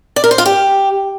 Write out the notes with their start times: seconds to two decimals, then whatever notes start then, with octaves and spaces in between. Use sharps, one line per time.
0.16 D5
0.24 A#4
0.31 C5
0.38 F4
0.46 G4